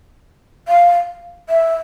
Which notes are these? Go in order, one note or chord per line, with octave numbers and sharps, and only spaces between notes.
F5
E5